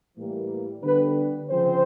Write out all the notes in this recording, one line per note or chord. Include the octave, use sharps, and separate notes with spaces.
A2 E3 G3 A#3
D3 G3 B3 B4
C#3 F3 G#3 C4 C5